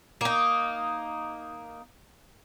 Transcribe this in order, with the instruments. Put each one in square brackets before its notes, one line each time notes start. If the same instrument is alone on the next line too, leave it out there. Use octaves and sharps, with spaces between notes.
[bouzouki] A#3 D#4